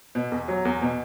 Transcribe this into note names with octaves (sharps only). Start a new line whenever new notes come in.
B2
E2
F#3
E2
B2